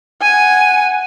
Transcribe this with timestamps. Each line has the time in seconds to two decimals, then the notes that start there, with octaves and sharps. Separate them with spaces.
0.22 F#5 G#5